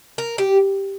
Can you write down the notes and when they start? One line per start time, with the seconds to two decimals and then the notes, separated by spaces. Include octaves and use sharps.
0.18 A#4
0.38 G4